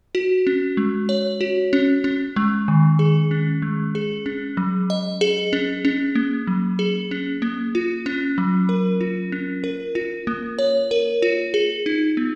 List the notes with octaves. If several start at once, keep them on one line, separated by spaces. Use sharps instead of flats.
F#4
C#4
G#3
C#5
F#4
C#4
C#4
G#3
D#3
G#4
C#4
G#3
G#4
C#4
F#3
D#5
G#4
C#4
C#4
A#3
F#3
G#4
C#4
A#3
F4
C#4
F#3
A#4
F4
C#4
A#4
F4
A#3
C#5
A#4
F4
G#4
D#4
B3